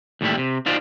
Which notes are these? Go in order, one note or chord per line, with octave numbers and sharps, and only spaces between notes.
D#2 A2 G3 E4
C3
D#4 F4 F#4 C5 D5 F5